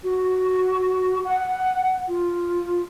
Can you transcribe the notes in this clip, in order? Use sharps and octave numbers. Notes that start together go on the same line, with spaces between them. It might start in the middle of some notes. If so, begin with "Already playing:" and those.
F#4
F#5
F4